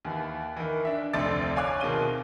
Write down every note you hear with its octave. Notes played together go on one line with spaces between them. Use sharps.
D#2 E3
D#3 E3
D4 E5
F1 D2 C4 A4 D5 A6
C#5 F5 G#5 A5 D6 F#6
B2 D#3 C4 G#4 D#7 G7